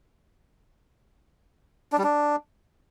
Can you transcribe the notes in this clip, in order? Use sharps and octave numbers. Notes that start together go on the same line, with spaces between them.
D4
G3
D4